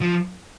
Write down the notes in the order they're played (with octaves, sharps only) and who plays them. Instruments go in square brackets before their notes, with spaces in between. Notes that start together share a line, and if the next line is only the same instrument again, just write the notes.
[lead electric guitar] F3